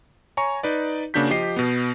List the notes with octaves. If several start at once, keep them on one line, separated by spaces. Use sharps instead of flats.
C#5 G#5 A#5 C#6
D#4 B4 D5
C#3 A#3 D4 F#4 G6 B6
F3 G4 D#5 C7
B2 B3